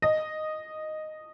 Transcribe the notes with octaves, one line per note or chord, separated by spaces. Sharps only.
D#5